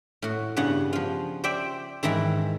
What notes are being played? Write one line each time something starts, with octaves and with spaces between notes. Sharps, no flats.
A2 F#4
G2 C#3 B3 F#5
F3 F4
C5 D5 E5 G5
G#2 D#3 E3 E4